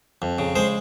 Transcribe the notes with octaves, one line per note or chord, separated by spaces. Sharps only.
F2
C#3
G#3 C5